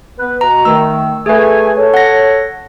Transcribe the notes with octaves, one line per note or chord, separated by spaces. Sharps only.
B3 B4
B2 A#5
D#3 A3 E6
A3 G#4 B4 G#5
A4 C#5
F#5 A#6